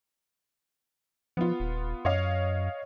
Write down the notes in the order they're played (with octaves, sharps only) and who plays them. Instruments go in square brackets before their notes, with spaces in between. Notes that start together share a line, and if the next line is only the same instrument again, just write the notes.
[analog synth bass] F3 [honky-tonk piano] B3 F4
[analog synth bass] D#1
[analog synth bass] F#2 [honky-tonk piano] C#5 D#5 F5